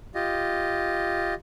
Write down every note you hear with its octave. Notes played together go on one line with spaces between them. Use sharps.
F4 G4 D#5